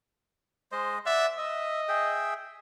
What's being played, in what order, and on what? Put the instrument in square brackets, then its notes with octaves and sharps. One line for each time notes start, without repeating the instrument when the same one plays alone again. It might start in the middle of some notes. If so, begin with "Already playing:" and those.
[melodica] G#3 D#5 [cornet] C5
[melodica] D5 F#5 [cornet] E5
[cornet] D#5 [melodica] E5
[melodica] G#4 E5 G5